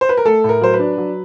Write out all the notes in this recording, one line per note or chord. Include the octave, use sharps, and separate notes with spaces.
C5
B4
A#4
A3 A4
A2
A#4
F#3 C5
B4
D4
F#3